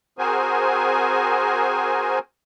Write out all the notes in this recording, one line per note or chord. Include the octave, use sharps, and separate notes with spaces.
C4 F#4 G#4 A#4 C5 G#5